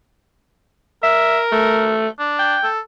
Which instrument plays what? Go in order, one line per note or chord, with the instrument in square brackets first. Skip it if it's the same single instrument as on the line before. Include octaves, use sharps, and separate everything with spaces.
[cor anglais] A#4 [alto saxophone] E5
[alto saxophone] A3
[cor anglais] D4
[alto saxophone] G5
[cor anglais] A4